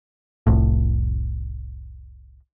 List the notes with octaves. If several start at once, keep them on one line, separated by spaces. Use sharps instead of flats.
F1 C2 A2